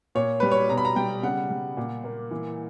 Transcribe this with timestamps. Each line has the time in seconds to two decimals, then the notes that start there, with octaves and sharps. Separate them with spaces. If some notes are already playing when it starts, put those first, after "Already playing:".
0.15 A#2 C#5
0.40 G3 B4
0.51 C#5
0.70 B2 A#5
0.78 B5
0.85 A#5
0.96 G3 G5
1.23 C#3 F#5
1.51 G3
1.77 A#2
2.04 A#3
2.31 E3